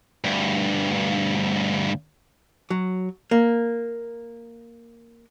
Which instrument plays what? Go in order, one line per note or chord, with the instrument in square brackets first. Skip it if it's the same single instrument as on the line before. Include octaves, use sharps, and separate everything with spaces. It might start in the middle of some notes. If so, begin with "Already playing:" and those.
[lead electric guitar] D2 G2
[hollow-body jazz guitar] F#3
A#3